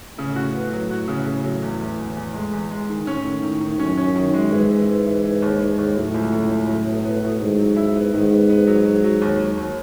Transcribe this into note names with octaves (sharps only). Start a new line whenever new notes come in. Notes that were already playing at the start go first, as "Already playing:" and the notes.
A2 C#3
F#4
B3
F#3
F#4
C#3
C#3
F#3
E2
E2
E2
E2
G#3
E2
G#3
D#3
A2 C#4
D#3
D#3
D#3
F#2 C#4
C#4
D#3
G#3
G#2 E3
E3
E3
E3
E3
D#2
E3
D#2
A2 F#3
C#2
C#2
C#2
F#3
B2
B3
B2
G#2 D#3
F#3
E4
B3
G#2 D#3
B3
B3
F#3
F#3
F#3
D#2
F#3
D#2